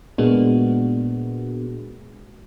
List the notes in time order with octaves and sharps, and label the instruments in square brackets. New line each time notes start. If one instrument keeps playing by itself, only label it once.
[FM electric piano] A#2 G#3 A#3 B3 D4 F#4